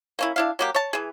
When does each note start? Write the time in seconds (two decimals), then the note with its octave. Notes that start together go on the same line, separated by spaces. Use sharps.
0.19 A#3 C#4 E4
0.36 D4 E4 F5
0.59 F#3 A#3 G4
0.75 C#5 A5
0.93 E3 G#4